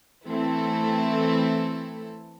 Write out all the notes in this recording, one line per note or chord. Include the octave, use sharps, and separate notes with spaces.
E3 A3 C4 E4 A4